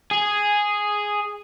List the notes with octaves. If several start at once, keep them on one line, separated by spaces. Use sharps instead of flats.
G#4